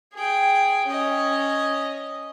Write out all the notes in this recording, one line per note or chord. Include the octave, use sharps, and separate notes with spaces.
G#4 G5
C#4 D#5